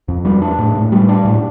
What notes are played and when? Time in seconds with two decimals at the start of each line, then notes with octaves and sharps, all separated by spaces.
0.08 F2
0.25 G3
0.42 D4
0.59 A2
0.75 A2
0.92 G3
1.09 D4
1.25 A2